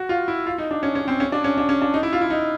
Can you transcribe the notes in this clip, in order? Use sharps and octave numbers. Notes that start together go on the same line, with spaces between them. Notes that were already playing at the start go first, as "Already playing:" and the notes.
Already playing: F#4
F4
E4
F4
D#4
D4
C#4
C#4
C4
C#4
D4
C#4
D4
C#4
D4
D#4
E4
F4
E4
D#4